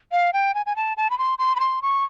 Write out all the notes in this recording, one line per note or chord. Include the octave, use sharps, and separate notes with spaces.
F5
G5
G#5
G#5
A5
A5
B5
C6
C6
B5
C6
C#6